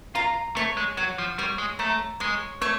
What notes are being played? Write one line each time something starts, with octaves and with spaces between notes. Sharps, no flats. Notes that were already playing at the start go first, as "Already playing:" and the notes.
F4 A#5
A3 C#5
G#3
F#3 F#5
F3
G3 C#5
G#3
A3 A#5
G#3 C#5
A3 C#5